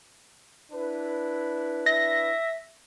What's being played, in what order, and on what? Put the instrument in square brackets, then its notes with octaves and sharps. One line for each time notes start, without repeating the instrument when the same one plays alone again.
[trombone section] D4 E4 B4
[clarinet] E5 [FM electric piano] A#6